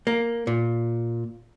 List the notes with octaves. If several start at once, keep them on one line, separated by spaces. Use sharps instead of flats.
A#3
A#2